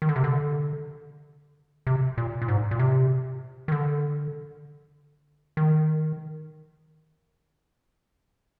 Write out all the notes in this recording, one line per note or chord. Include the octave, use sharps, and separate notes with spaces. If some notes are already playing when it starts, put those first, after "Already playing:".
D#3
D3
C3
D3
C3
A#2
A#2
G#2
A#2
C3
D#3
D3
D#3